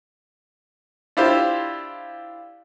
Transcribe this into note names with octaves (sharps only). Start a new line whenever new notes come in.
D4 E4 F4 G4 C5